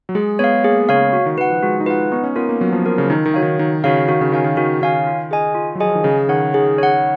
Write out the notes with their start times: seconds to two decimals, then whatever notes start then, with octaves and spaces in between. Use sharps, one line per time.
0.09 F#3
0.15 G#3 G#4
0.39 B3 C#5 F5
0.64 A#3 G#4
0.89 C#3 C#5 F5
1.13 F#4
1.26 D#3
1.38 D#3 B4 F#5
1.50 F3
1.63 G#3 F#4
1.80 D#4
1.86 F4 B4 F#5
2.12 B3 D#4
2.24 C#4
2.36 B3 F4 A#4
2.49 A#3
2.61 F#3 B3
2.72 F3
2.86 F3 F4 A#4
2.98 C#3
3.10 D#3 D#4
3.26 D#3
3.34 F#4 C#5 F5
3.42 D#3
3.59 D#3 D#4
3.84 C#3 F#4 C#5 F5
4.08 D#3 F#4
4.21 C#3
4.32 D#3 C#5 F5 G#5
4.44 D#3
4.57 D#3 F#4
4.81 D#3 C#5 F5 G#5
5.07 F4
5.31 G#4 D#5 G#5
5.55 F4
5.75 F#3
5.80 F3 G#4 D#5 G#5
5.95 D#3
6.04 C#3 G#4
6.29 D#3 C#5 F#5
6.54 D#3 G#4
6.78 C#5 F#5